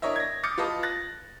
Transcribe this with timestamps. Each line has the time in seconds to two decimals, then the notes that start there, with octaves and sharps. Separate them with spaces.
0.02 D4 E4 A#4 C#5 D#5 E5
0.16 G#6 A#6
0.43 D6 D#6 F6 G6 A6 C#7
0.58 F4 B4 D#5 A5 D#6
0.83 F#6 A6 A#6